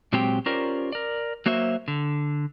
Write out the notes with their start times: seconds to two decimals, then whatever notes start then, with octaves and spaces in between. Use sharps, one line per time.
0.13 A#2 F#3 G#3 C4 G4 G5
0.46 C#4 F4 G4 A#4 C5 D5
0.92 A#4 D5
1.46 F#3 A#3 F#4 C5 E5
1.88 D3